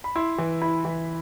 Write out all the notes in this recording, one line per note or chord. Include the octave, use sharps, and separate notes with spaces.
B5
E4 C6
E3
E4 B5
E3